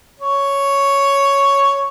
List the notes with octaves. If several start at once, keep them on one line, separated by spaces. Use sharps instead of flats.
C#5